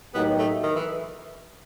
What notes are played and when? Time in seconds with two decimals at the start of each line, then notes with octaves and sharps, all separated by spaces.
0.14 A2 F#3 A#3 B3 D#4 G4
0.38 A3
0.63 D#3
0.76 E3